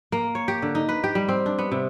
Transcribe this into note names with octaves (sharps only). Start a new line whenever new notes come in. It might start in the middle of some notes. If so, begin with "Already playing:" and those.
A#3
C#5
G4
D3
D#4
B4
G4
G3
C4
D4
B3
C3